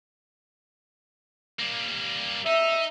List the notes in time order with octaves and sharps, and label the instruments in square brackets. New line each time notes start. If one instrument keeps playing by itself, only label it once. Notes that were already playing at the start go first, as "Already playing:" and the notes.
[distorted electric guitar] G3 A#3
[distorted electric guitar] D#4 [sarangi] E5